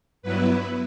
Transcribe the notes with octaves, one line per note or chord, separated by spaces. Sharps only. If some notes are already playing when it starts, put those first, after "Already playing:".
G2 F#3 B3 E4 B4